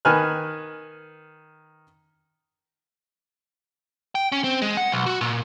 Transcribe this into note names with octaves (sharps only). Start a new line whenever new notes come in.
D#3 B4 G#5 F6 F#6
G5
C#4
C4
G#3
F#5
B1
F#4
A#2